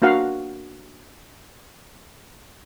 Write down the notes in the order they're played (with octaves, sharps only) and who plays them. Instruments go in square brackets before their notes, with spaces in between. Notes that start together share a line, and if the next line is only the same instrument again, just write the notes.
[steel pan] A#3 D4 F#4 F5 F#5